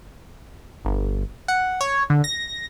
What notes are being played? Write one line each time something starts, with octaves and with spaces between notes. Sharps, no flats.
G1
F#5
C#5
D3
A#6